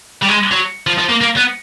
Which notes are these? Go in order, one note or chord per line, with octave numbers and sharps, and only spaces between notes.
G3
G#3
F#3
F3
F3
A#3
A#3
B3